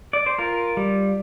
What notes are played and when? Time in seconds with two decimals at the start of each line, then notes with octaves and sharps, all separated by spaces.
0.13 D5
0.26 C5
0.38 F4 A#4
0.77 G3